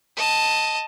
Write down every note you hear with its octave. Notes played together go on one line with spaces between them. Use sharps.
D#5 A5